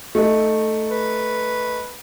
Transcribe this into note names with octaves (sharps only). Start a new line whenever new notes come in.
A3 D#4
B4